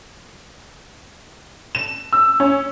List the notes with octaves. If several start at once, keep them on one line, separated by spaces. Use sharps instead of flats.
E7
E6
C#4